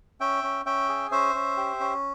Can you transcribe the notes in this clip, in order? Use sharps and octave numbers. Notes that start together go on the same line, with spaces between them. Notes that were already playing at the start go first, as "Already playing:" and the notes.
C#4 E5 G5
C#4
C#4 E5 G5
G#4
C#4 C5 E5
C#4
G4
C#4